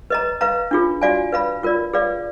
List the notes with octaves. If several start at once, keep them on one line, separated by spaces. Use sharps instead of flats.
B4 D#5 A#5
B4 F5 A#5
D4 F4 G#4
F#4 D5 F5 G#5
B4 F5 B5
F4 A#4 D5
G#4 B4 D5 F5